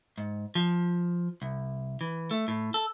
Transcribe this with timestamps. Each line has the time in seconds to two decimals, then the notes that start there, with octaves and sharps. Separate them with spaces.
0.18 G#2
0.55 F3
1.42 C2
2.01 E3
2.31 A3
2.48 A2
2.74 A4